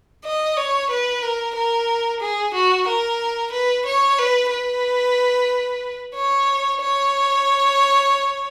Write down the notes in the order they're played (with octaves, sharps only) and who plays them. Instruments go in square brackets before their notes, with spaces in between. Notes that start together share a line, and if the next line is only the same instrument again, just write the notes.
[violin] D#5
C#5
B4
A#4
A#4
G#4
F#4
A#4
B4
C#5
B4
B4
C#5
C#5